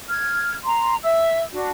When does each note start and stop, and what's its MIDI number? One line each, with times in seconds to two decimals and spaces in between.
0.09 0.54 89
0.09 0.54 92
0.65 0.94 82
0.65 0.94 84
1.03 1.42 76
1.03 1.42 88
1.52 1.71 62
1.52 1.71 66